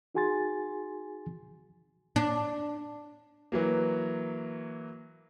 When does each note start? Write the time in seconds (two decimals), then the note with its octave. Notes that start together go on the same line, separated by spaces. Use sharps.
0.15 D#4 F#4 G#4 G#5 C6 A6
2.16 D4
3.52 E3 F#3 A#3